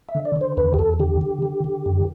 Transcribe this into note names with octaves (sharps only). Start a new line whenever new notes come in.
E5
D3
D5
D3
C5
E2 B4
G4
E2 A4
D3 G4
D3
D3
D3
F#2